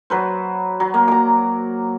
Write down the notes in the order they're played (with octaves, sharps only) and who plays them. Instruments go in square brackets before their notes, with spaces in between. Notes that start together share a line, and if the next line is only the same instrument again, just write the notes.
[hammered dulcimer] F#3 B4 C5
F#3
A#3
A#5 D6